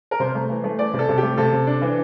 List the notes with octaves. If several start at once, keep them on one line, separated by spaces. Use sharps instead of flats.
A#4
C3 C5
A3
E3
A3
E3 D5
C3
A4
C3
G4
A3
C3 A4
C3
D4
E3